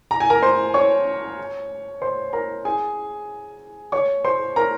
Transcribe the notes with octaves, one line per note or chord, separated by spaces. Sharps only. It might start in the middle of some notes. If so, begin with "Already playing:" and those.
A#5
G#5
A#4 A#5
C5 C6
C#5 C#6
C5 C6
A#4 A#5
G#4 G#5
C#5 C#6
C5 C6
A#4 A#5